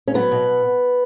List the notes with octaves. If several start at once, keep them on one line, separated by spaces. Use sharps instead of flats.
C#4
F#3 B3
B2